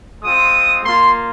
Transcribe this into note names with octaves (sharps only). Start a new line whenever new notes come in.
G#3 C4 F4 D#6
A#3 F4 C6